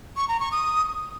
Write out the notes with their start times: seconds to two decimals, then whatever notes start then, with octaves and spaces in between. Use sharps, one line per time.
0.16 C#6
0.28 A#5
0.40 C#6
0.52 D#6